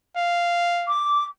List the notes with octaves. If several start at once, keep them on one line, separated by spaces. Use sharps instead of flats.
F5
D6